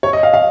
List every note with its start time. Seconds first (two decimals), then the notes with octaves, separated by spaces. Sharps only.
0.03 C#5
0.13 D#5
0.23 F5
0.34 F5